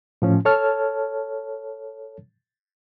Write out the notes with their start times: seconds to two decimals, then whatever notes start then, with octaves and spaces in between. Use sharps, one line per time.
0.22 A2 F3 C#4
0.45 A4 C#5 A5 F6